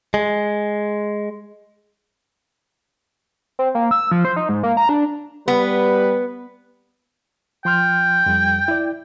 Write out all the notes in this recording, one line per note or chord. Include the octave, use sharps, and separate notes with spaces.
G#3
C4
A#3
E6
F3
C5
D#4
G#2
A#3
A#5
D4
G3 B3 B4
F3 G5 C6 F6
F2 G3
E4 D5